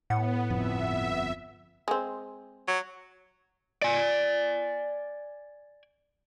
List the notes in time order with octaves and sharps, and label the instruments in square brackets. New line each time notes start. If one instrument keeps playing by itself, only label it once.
[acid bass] A2 [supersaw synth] B3 [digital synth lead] F#5
[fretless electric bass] G1 F2 [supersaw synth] E5
[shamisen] G#3 C4
[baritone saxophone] F#3
[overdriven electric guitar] D5 G#5